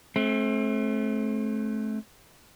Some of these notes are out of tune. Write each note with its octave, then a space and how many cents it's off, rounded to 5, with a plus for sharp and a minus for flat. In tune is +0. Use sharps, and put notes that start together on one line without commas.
A3 -30 C4 +30